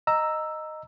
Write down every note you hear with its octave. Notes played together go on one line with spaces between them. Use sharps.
D#5 A#5 E6